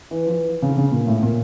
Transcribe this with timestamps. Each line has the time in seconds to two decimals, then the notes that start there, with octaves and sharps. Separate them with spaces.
0.11 E3
0.27 F3
0.32 E3
0.62 C#3
0.69 D3
0.77 C#3
0.92 A#2
1.07 A2
1.23 A#2